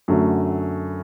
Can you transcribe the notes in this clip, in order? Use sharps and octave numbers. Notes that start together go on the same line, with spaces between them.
F#2 D3 A3 F#4